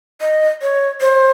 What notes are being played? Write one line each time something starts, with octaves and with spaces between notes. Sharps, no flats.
D#5
C#5
C5